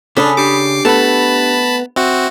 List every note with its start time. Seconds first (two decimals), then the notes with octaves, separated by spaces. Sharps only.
0.17 C#3 C#4 D4 A4 B5 D#6 B6
0.37 D4 G4 D6 C7
0.85 A3 B3 A4 A5 B5
1.96 C4 F#4 E5